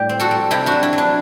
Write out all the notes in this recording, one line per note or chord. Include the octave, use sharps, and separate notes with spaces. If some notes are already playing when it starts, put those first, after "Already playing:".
Already playing: A2 G3 G4
C4
F#4 A4
G3
C3 E4 G4
D4 F#4
F#3
E4
F#3
D4